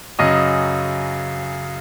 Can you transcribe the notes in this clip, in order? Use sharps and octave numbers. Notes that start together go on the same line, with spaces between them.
F#2 C#3 F#3 D#5 D#6